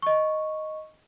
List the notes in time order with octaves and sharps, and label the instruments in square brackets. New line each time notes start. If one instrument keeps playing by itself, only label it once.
[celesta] D#5 C#6